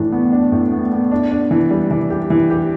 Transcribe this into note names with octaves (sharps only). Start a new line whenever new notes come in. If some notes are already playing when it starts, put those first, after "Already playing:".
Already playing: A2 E3 D4
B3
D4
A2
B3
B3
D4
D4
E3
G3
E3
G4
E3
G4